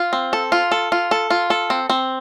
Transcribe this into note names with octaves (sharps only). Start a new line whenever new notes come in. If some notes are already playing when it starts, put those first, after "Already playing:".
Already playing: F4
C4
A4
F4
A4
F4
A4
F4
A4
C4
C4